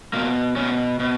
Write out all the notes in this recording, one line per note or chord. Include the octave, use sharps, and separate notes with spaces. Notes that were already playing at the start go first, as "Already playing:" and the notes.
B2 A#3
B2 C#4
B2